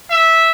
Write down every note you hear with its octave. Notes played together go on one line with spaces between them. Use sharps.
E5